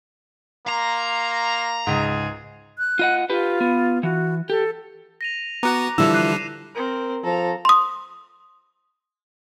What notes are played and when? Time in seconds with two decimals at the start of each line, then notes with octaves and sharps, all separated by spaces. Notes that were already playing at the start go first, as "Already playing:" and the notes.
0.68 A#3 A#5 C6
1.87 C#2 G#2 G#4
2.78 F#6
2.99 F4 D#5 F#5
3.30 F4 G4 B4
3.60 B3
4.03 E3 F#4
4.50 G4 A4
5.21 A#6 D#7 F7
5.63 B3 F#4 F#5 A#5 D6 F#6
5.98 D3 E3 F3 G3 E4 A4 E6 E7
6.14 D6 F#6 C7 D#7
6.75 C4 A#4
7.24 F3 A4 A#5
7.65 C6 D#6